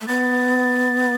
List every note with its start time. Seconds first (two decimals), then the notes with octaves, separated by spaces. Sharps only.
0.01 A3
0.07 B3 A6